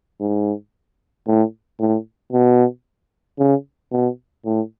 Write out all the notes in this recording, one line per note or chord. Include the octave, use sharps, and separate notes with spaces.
G#2
A2
A2
B2
C#3
B2
A2